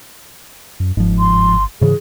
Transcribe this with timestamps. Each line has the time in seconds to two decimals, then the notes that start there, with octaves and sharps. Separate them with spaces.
0.80 F#2
0.97 G1 G#2 F3
1.19 C6
1.81 G#2 C#3 E3 G#4